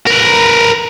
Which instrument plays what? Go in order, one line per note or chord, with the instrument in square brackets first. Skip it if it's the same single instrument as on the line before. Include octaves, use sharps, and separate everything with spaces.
[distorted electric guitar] A#4 B4